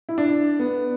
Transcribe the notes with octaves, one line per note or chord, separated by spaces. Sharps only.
E4
D4
B3